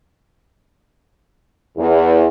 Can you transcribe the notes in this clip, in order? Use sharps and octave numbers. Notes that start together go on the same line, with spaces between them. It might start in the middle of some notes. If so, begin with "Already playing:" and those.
E2